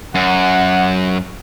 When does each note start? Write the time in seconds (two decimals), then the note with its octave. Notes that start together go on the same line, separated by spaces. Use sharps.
0.15 F#2 F#5